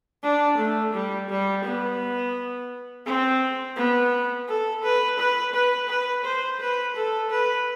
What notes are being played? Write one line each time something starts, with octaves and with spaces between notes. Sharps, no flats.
D4
A3
G3
G3
B3
C4
B3
A4
B4
B4
B4
B4
C5
B4
A4
B4